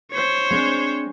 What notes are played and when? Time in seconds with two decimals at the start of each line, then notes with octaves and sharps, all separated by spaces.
0.11 C5 C#5
0.51 G#3 C4 D4